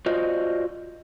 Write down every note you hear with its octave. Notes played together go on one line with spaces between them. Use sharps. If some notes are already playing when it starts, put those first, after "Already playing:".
F4 F#4 C5 D5 D#5